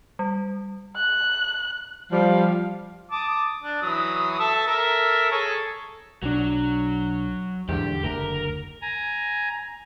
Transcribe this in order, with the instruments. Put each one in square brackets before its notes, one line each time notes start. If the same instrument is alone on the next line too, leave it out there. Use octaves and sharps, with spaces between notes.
[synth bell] G3
[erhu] F#6
[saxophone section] F3 G3 [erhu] F5
[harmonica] A5 D6 D#6
D4
E3 F#3 D#6
A4 E5 A5
A4 A#4 E5
G#4 A4 C#5
[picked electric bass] B1 D4 [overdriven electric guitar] F#3
[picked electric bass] E2 G#2 D3 [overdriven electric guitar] G4
[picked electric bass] F#1 D2 [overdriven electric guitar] A#4
[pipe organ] G#5 A#5